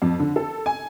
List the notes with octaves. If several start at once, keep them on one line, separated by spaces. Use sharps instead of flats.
F2
D3
A4
G#5